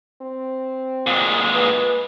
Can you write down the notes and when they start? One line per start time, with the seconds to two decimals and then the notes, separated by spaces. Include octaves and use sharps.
0.22 C4
1.07 A#2 G#3
1.54 B4